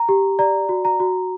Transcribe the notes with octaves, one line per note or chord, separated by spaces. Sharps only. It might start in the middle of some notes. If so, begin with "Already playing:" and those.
Already playing: A#5
G4
D5 A#5
F#4
A#5
F#4